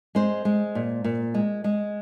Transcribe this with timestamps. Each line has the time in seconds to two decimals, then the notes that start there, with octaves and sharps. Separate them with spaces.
0.15 G#3 C5
0.45 G#3
0.75 A#2
1.04 A#2
1.34 G#3
1.64 G#3